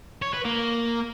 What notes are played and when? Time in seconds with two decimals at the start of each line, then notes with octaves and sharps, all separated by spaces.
0.22 C#5
0.33 B4
0.45 A#3